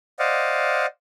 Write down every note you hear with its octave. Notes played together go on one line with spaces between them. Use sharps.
C5 D5 D#5 F5 F#5